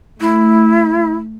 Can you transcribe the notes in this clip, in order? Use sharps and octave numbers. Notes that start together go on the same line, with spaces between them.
A3 E4